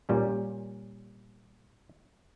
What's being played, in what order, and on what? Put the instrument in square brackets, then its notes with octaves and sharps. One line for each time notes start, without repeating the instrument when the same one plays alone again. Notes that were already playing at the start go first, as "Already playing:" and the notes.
[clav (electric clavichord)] A#2 G3 C#4